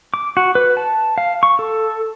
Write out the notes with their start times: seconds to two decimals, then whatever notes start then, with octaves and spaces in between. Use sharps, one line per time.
0.14 D6
0.37 F#4
0.55 B4
0.77 A5
1.18 F5
1.43 C#6
1.59 A4